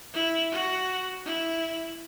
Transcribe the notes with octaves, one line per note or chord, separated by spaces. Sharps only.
E4
F#4
E4